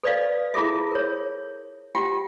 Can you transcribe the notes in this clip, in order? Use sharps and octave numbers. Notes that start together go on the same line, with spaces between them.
A4 B4 D5 D#5 F5
E4 F4 G#4 A4 E5
A#4 C#5
F4 G4 F#5 G5